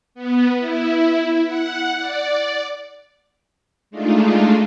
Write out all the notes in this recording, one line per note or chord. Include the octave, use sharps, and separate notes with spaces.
B3
E4
F#5
D5
G#3 A3 D4 D#4 F4